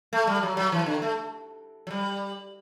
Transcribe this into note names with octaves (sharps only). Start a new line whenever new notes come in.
A3
G3
F#3
F#3
E3
D3
A3
F#3
G3